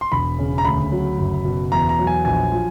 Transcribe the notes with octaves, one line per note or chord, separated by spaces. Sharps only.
C6
E1 B5
C#3
A#5
D2 B5
F#3
F#1
B2
E2 A#5
A#5
F#3
G#5
A#1 G#5
F3